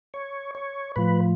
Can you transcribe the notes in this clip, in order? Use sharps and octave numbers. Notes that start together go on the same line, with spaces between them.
C#5
C#5
A2 F3 B4